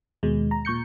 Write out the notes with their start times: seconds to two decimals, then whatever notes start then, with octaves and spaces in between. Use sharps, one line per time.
0.23 D#2 B2 G#3
0.51 A#5
0.65 A#2 C#6 G6 C#7